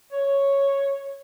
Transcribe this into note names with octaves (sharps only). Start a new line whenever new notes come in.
C#5